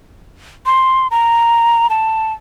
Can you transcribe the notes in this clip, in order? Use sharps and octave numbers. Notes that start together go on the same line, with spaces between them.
C6
A#5
A5